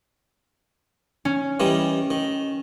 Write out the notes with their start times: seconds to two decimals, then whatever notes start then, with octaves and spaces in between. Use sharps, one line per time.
1.25 C#4
1.60 D#3 E3 G3
2.10 D#3